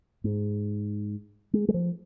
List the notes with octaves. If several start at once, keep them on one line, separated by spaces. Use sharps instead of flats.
G#2
G#3
G#3
F3